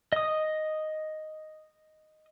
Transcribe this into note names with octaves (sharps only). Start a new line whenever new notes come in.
D#5 D#6